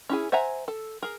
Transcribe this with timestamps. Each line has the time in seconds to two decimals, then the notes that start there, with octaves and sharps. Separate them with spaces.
0.09 C#4 E4 G#4
0.32 C5 E5 F#5 G#5 A#5
0.68 A4
1.03 G#4 A#4